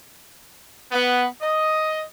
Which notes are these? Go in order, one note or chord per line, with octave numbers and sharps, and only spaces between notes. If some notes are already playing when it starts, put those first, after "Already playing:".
B3
D#5